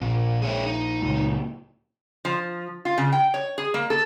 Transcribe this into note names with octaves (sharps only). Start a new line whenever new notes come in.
A#1 A#2
G#4 C#5 E5
D#4
C#2 A#2
F3
F4
C#3
G5
C#5
G#4
A#3
A4